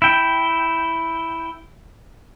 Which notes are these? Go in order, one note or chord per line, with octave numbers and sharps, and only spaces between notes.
E4 G5